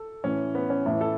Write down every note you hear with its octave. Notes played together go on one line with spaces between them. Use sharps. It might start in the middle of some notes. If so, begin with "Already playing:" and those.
Already playing: A4
A2 E3 C#4
B3
C#4
A2 E3 E4
A4